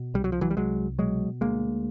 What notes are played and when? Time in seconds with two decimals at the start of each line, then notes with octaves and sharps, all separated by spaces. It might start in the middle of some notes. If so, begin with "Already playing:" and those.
Already playing: B2
0.14 C2 G3
0.24 F#3
0.32 F3
0.41 E3 F#3
0.51 G3
0.57 C2 F#3 G#3
0.99 B2 F#3 G#3
1.41 D2 G#3 A#3